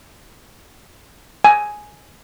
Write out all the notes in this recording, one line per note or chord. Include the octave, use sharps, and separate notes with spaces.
G#5